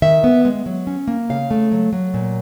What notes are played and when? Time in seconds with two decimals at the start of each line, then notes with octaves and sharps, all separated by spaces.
0.02 D#3 E5
0.24 B3
0.45 G#3
0.66 F#3
0.87 C#4
1.08 A#3
1.29 C#3 F5
1.51 A3
1.72 F#3
1.93 F#3
2.14 A#2